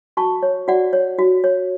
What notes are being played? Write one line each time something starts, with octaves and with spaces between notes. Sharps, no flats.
F#4 A5 C#6
C#5
F#4 D5 F#5
C#5
F#4
C#5